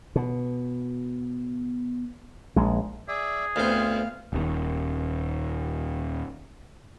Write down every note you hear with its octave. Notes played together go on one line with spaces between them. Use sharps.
B2
A#1 G#3
G#4 D5 E5
D2 B3 C4 C5 F5
D#1 D#2